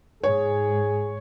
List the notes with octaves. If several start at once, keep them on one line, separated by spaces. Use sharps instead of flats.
G#2 G#4 C#5